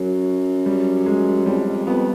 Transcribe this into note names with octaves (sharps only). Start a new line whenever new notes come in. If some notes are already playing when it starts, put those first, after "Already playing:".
Already playing: F#2 F#3
G3
G#3
F2 G3
F2
F2 B3